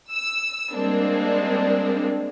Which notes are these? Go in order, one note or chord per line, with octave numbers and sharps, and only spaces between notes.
E6
G3 G#3 A#3 C4 D4